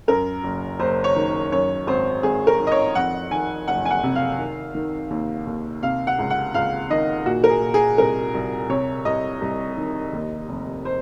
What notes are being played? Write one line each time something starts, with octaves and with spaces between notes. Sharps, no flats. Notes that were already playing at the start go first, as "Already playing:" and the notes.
F#2 A#4
F#1
F#1 C5
C#5
D#3
F#2 C#5
G#1 C5
G#1 G#4
A#4
D#3
D#5
C#5
F2 F#5
D#3 G#5
F#1 F#5
G#5
F#5
C3
F5
D#3
D#3
D#2
D#2
C3 F5
F#5
C#2
F#5
C#2 F5
D#3 D#5
A#2 F#4
A#4
G#4
A#2
G#4
C2 A#4
C2
C3 C#5
C2 D#5
C2
D#3
D#2
F1
C5